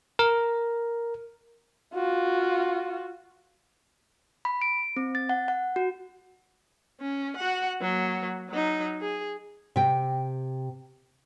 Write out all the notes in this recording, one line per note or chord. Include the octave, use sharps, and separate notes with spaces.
A#4
F4 F#4
B5
D7
C4
A6
F#5
F#5
F#4
C#4
F#4 F#5
F#3 A#3
F#3 D#4
G#4
C3 G5